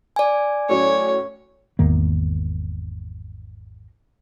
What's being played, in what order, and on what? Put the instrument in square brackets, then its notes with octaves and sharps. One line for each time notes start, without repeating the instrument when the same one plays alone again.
[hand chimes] D5 G#5
[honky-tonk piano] A2 F#3 C#4 [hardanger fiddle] C#5
[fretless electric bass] G#1 E2 D#3 A#3